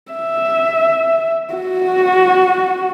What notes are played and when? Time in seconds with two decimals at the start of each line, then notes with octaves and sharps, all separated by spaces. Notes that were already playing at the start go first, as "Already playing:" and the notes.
0.12 E5
1.54 F#4